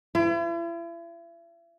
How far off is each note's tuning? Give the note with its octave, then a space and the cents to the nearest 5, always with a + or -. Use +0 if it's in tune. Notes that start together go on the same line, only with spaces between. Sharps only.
E4 +40